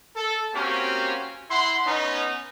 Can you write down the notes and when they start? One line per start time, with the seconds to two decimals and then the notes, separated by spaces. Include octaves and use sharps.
0.16 A4
0.55 A#3 C4 C#4 F#4 G4
1.51 E4 F#5 C6
1.87 B3 C#4 D#4